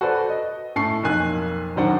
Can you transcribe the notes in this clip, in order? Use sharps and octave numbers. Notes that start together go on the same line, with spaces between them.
F#4 A4 B4 C5 D5
D#5
A2 A5 C#6 C7
B1 F2 A#3 G#5 F#6
D#1 D#3 F#3 D4 C5 F#5